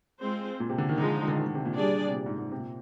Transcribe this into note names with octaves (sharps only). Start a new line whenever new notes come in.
G#3 C4 F4 C5
A#2
C3
D3
D#3
D3 F3 G#3 D#4
D3
D#3
D3
C3
A#2
G3 D4 G#4 D5
C3
A#2
G#2
G#2
C3
A#2